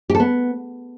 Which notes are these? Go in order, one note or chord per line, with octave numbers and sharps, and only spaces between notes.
G4
A4
B3